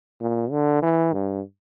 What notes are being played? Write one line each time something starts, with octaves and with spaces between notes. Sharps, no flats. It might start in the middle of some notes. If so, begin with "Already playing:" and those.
A#2
D3
E3
G2